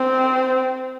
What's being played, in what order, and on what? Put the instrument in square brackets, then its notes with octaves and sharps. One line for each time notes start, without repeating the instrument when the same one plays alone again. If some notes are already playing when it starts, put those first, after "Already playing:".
Already playing: [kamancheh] C4